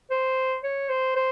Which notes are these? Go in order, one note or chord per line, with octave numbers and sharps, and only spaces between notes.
C5
C#5
C5
C5